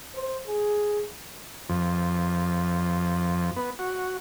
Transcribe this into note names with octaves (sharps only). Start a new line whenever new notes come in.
C5
G#4
F2
B3
F#4